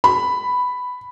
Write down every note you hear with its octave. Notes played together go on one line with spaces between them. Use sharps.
B5